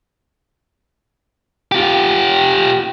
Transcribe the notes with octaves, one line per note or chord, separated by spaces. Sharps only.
F4 G4